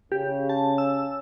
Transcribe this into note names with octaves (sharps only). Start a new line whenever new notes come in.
C#3 G4
A5
E6